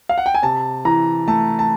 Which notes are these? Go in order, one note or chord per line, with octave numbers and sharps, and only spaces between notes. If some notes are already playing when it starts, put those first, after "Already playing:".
F5
F#5
G5
G#5
C3 A5
E3 A#5
A3 A5
A5